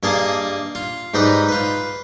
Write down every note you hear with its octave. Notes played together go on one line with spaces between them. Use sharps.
G2 A#3 G#4 D#5 A5
F4
G#2 G3 D#4 B4 D#5
F4 B4